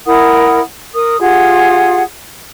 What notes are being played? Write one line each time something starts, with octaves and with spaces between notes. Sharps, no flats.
E4 A#4 F#5 D#6
A#4 D#6
F4 G4 G#4 F#5